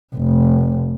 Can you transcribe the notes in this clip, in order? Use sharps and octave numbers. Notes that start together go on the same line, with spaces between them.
F1